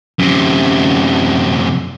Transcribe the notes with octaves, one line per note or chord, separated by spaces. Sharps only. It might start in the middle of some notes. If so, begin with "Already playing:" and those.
F#2 C3